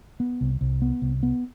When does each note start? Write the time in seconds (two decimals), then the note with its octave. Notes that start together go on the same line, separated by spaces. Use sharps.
0.20 B3
0.41 C2
0.61 C2
0.82 B3
1.02 C2
1.23 B3